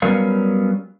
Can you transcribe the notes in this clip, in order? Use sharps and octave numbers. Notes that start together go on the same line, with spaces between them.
F#3 G3 B3 C#4 A#4 F5